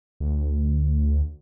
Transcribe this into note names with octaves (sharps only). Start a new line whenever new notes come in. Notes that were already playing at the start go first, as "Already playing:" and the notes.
D2